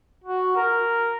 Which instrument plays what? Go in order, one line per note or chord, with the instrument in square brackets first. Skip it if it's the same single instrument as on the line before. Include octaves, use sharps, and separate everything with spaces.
[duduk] F#4
A#4